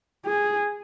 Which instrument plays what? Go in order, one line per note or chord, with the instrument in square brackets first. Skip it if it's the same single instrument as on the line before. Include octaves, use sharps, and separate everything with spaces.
[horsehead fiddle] G#4